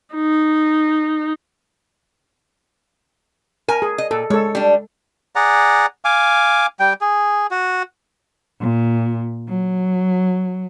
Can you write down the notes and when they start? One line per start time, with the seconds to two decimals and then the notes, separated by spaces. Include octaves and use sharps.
0.15 D#4
3.69 A#4 G#5
3.82 G#4
3.98 D#5
4.11 A#2 A4
4.30 G#3 A4 C#5
4.55 G3 D4
5.35 G#4 D5 F#5 A#5
6.05 F5 G#5 D6
6.80 G3 G5
7.01 G#4
7.51 F#4
8.61 A#2
9.48 F#3